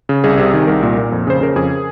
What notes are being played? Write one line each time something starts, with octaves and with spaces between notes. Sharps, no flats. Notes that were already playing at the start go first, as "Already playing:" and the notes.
C#3
C2 G#4
C3
D#3
C2 A#4
A#2
A#2
F2
C#3 C5
C#3 A#4
F2 G#4